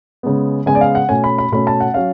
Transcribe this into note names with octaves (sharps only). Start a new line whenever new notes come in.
C#3 G#3 B3
C#3 G#3 B3 G#5
D5
F5
F#5
B2 A3 C#4 G#5
B5
B5
B2 A3 C#4 B5
A5
F#5
F#3 C#4 F5